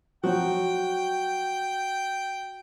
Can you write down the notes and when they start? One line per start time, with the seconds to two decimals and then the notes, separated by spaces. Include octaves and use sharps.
0.24 F3 F#3 F#4 G5